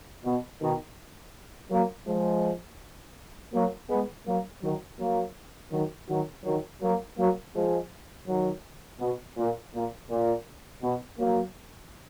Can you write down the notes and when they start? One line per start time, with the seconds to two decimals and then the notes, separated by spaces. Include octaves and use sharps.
0.25 B2
0.61 B2 D#3
1.71 F#3 A#3
2.07 F3 G#3
3.54 F#3 A#3
3.90 G#3 B3
4.26 F#3 A#3
4.63 D#3 F#3
5.00 F#3 A#3
5.72 D#3 F#3
6.09 D#3 F#3
6.45 D#3 F#3
6.82 F#3 A#3
7.18 F#3 A#3
7.55 F3 G#3
8.27 D#3 F#3
9.01 B2
9.37 A#2
9.74 A#2
10.10 A#2
10.83 B2
11.19 F#3 A#3